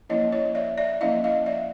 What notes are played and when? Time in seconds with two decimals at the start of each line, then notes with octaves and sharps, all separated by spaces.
0.09 F3 A#3 C#4 E4 C#5 D#5
0.32 C#5 D#5
0.55 D5 E5
0.78 D5 E5
1.01 F3 A#3 C#4 E4 D#5 F5
1.24 D#5 F5
1.46 D5 E5